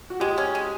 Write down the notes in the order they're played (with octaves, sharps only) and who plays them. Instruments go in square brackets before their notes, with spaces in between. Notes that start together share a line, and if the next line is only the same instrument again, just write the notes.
[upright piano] F#4
[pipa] G#3 [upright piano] G4
[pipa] C#4
G#3